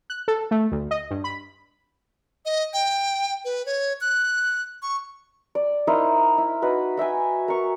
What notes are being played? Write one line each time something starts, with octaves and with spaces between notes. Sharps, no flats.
F#6
A4
A3
D2
D#5
G2
B5
D#5
G5
B4
C#5
F#6
C#6
D5
D#4 E4 A#4 C5
E4
D#4 F#4 B4
F#4 E5 G5 G#5
A#4 C#6